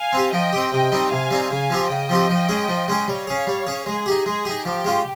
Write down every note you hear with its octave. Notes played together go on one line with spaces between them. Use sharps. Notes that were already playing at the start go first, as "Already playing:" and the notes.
Already playing: F5 G#5
C4 G4
F3 D#5 G5
C4 G4
C3 D#5 G5
G3 C4 D#4
C3 F5 G#5
G3 C4 D#4
C#3 F5 G#5
F3 C4 G4
C#3 D#5 G5
F3 C4 G4
F3
G#3 C#4 G#4
F3
G#3 C#4 G#4
G3 C#5 F5
C#4 G#4
G3
C#4 G#4
G#3 G#4
D#4 G4
G#3 G#4
D#4 G4
F3 G4
G#3 C#4 F4